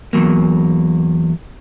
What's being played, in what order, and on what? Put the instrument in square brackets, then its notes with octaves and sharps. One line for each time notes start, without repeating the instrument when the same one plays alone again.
[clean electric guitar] E2 F3 F#3 A#3